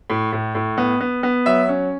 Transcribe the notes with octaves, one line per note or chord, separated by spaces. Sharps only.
A2
A2
A2
B3
B3
B3
F#3 E5
C#4